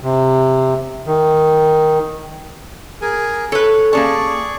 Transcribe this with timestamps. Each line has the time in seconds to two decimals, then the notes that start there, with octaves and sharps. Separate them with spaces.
0.01 C3
1.06 D#3
3.02 G#4 A#4 G#5
3.52 A4 B4 C#5
3.93 A#3 C#4 G#4 D5 A5 C#6